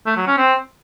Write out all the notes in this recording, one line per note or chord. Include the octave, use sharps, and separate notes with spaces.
A3
F#3
C#4
C4